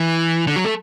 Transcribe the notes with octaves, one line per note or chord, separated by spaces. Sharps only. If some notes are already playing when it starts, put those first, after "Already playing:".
Already playing: E3
D3
F#3
A3